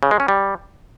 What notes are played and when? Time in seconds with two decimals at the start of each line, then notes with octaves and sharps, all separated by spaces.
0.03 C#3
0.11 G#3
0.20 C#4
0.28 G3